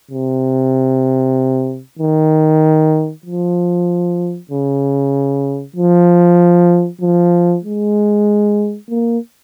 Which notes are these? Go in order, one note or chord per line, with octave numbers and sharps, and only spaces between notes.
C3
D#3
F3
C#3
F3
F3
G#3
A#3